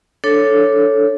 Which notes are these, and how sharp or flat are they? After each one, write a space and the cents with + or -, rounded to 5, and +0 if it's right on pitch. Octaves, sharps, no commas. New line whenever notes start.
D4 +0 A4 +0 C#5 +0